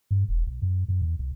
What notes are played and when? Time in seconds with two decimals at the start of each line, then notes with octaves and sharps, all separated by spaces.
0.11 G2
0.29 E1
0.47 B1
0.62 F#2
0.88 F#2
1.02 E2
1.19 C2